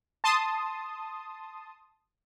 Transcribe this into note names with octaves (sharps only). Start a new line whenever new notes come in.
A5 C6 D#6